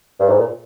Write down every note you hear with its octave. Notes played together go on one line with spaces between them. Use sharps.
G2
G#2
A#2